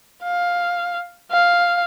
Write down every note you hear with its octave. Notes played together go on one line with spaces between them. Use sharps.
F5
F5